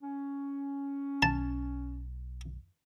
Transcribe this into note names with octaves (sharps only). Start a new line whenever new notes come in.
C#4
B1 A5